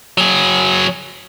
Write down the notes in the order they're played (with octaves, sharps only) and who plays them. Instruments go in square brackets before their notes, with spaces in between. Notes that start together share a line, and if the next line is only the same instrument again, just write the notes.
[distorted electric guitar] F#3 G#4